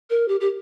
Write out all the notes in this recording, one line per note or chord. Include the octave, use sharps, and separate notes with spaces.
A#4
G4
G4